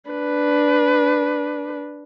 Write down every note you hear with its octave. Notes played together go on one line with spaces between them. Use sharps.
D4 B4